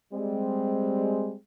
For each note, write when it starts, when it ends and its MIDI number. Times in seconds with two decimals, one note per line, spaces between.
0.13 1.34 55
0.13 1.34 56
0.13 1.34 60